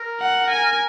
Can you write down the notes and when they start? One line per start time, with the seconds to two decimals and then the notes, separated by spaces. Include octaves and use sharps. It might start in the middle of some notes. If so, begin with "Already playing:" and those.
Already playing: A#4
0.20 F#5
0.50 G#5